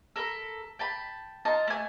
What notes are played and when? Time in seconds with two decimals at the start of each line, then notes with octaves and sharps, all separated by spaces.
0.16 A4 A#4 B5
0.79 G5 A5 B5
1.45 D#4 F4 A5 A#5
1.67 A3 G#5